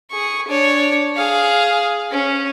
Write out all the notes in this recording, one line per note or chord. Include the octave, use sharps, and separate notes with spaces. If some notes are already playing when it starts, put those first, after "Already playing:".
G#4 C#6
D4 C#5
G#4 F5
C#4